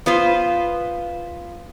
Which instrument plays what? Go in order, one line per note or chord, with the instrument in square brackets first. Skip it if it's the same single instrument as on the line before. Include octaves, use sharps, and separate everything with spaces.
[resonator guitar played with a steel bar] B3 F4 B4 C5